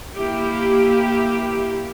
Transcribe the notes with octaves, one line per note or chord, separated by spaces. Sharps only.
A#3 E4 G4